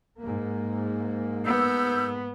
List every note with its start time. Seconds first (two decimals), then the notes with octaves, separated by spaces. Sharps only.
0.20 G#2 A#3
1.45 B3 E6 G6